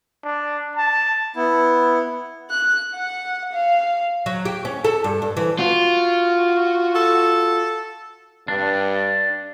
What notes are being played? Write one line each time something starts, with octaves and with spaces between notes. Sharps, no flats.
D4
A5
B3 E4
F#6
F#5
F5
F#3
G4
C#4
A4
G2
G2
E3
F4 F#4
A4
G2 D4